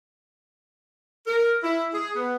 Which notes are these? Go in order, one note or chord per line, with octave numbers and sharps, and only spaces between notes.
A#4
E4
G#4
B3